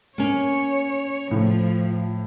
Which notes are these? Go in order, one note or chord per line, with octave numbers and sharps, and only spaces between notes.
A#3 C#4 C#5
A2 F3